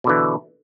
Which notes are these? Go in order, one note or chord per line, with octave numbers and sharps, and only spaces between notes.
B2 D3 E3